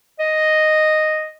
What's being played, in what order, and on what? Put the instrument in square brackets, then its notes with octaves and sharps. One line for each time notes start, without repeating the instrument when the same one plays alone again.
[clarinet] D#5